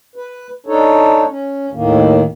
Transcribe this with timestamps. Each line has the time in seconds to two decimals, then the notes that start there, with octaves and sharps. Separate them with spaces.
0.16 B4
0.66 D4 D#4 A4 C#5
1.28 C#4
1.72 D#2 A2 D#3 A#3